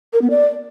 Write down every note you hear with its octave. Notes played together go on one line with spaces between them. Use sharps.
A#4
B3
D5